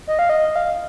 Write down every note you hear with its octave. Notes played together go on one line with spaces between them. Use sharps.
D#5
F5
D#5
F5